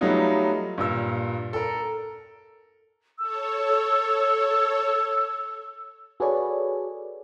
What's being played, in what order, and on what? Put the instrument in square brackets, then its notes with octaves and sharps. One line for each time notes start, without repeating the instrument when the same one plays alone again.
[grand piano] F#3 G3 A3 B3 D#4 F4
G2 A#2 E6
A4 A#4
[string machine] A4 C#5 [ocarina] E6
[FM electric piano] F#4 G#4 A4 B4 C#5 D5